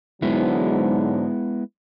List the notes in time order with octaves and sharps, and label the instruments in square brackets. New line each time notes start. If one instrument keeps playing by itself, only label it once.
[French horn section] G#2 D3 F#3 [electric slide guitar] G#3 B3 E4